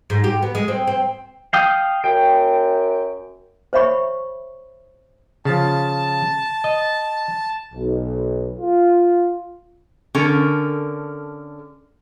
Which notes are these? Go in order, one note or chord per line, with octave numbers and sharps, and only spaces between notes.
G#2
G4
B3
G#3
C4
C4
F5 G5 D#6
F#2 G5
C5 C#5 E5 B5 C#6
C#3 F3 A5
D#5
B1
F4
D3 C#4 A4 A#4